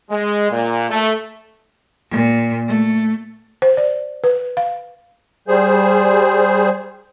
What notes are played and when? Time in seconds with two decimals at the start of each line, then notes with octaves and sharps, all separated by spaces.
0.11 G#3
0.51 A#2
0.90 A3
2.09 A#2
2.67 A3
3.62 C5
3.77 D5
4.24 B4
4.57 F5
5.48 G3 G#4 C5